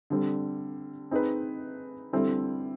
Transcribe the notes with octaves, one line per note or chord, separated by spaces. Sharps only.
D3 G3 C4
C4 D#4 G#4 B4
D3 G3 C4 E4 A4